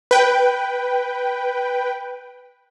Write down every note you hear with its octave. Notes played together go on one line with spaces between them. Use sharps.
B4 G5